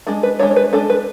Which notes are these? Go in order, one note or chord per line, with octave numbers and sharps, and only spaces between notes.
G#3 D4 G#4
B4
G#3 D4 C#5
C#5
B4
G#3 D4 A4
B4